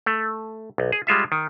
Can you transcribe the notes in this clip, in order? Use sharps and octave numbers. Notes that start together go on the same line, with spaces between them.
A3
B1
G#4
G3 G#3 F4 E5
D#3